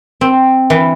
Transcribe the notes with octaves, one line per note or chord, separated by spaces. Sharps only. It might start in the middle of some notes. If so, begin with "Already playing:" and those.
C4
E3